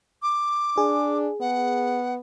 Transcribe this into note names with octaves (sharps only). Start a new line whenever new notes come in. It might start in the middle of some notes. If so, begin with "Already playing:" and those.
D6
D4 G#4
B3 F#5